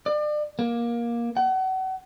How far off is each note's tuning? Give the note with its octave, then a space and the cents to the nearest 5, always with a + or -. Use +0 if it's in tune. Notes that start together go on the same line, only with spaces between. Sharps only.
D5 +35
A#3 +15
F#5 +35